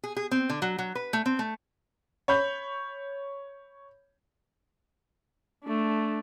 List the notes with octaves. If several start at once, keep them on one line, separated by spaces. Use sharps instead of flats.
G#4
G#4
C4
D3
F#3
F#3
B4
A3
C4
A3
C#5 B5 G6
A3 D4